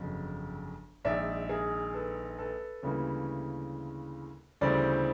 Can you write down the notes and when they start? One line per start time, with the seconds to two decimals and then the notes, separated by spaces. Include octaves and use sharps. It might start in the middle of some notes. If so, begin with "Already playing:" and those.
Already playing: G1 F2 C#3 F#3
1.05 A#1 G#2 D#3 D5 E5
1.49 G#4 A#4
1.94 A4 B4
2.38 A4 B4
2.83 D2 C#3 E3 G3 A#3 B4 C#5
4.61 D2 C#3 E3 G3 C4 C5 D5